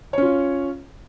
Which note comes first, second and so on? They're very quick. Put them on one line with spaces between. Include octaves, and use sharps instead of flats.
C#5 C#4 F4